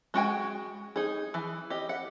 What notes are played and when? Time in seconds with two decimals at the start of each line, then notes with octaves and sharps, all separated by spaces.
0.14 G#3 F#4 G5 G#5
0.96 D#4 G#4
1.34 E3
1.70 G4 D#5
1.89 F#5